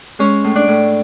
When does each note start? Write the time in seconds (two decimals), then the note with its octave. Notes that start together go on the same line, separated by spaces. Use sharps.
0.19 G#3 C#4 C#5
0.44 A2
0.55 D4 D5
0.68 A2